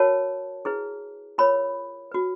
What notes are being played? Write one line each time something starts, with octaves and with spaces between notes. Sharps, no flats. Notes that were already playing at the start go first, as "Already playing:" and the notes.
Already playing: F#4 A#4 C#5 A5
E4 G#4 B4
F4 A#4 C#5 B5
F#4 B4